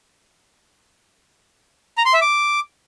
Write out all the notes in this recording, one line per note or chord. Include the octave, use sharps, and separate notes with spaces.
A#5
C6
E5
D6